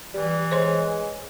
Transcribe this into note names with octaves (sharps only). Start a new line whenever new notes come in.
E3 G3
G#3 C5 C#5 C6